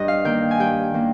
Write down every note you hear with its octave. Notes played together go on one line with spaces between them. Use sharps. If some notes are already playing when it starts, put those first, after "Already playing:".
Already playing: G2 D#5
F5
D#3 A#3 G5
G#5
G2 G5
D#3 A#3